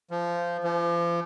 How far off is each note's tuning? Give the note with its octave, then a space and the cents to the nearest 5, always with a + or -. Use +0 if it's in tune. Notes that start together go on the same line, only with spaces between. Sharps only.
F3 -15
F3 -35